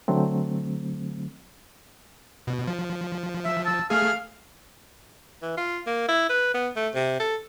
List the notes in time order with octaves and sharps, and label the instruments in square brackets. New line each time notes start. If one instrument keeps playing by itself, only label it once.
[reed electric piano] D3 F#3 A3 C4
[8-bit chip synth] B2
F3
[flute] E5
[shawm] A5 [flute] E6
[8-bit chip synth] A3 G#4 [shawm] F5 [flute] F6
[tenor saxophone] E3
F4
A#3
E4
B4
B3
A3
C3
A4